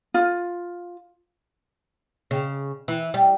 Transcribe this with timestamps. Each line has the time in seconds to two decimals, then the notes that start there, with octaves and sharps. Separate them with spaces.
0.14 F4
2.31 C#3
2.88 E3
3.14 G3